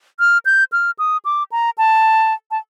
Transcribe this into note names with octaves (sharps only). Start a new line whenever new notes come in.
F6
G6
F6
D#6
D6
A#5
A5
A5